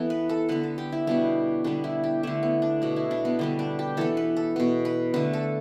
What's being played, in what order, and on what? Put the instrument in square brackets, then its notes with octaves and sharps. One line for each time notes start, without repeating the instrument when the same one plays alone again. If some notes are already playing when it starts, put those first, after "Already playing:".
Already playing: [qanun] E3 B3 A4
B4
A4
D3 B3 B4
A4
G4
E4
B2 G3 B3 D4
D3 G3 B3 D4
E4
G4
D3 A3 E4
B3
D4
B2 B3
E4
D4
B3
D3 G3 B3
D4
G4
E3 B3 A4
B4
A4
B2 B3
B4
D3 A3 B4
A4